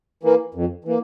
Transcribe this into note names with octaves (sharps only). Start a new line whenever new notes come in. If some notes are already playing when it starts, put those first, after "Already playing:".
E3 A#3
F2
E3 A#3